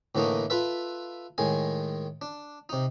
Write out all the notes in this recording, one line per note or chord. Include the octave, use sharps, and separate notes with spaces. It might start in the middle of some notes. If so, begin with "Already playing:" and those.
A2 D3 E3 A3 A#3 D#4
F4 A4 B4 E5
A2 D#3 G#3 G#5
D4
C3 D#4